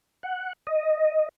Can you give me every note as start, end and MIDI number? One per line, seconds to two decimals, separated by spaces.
0.23 0.53 78
0.67 1.29 75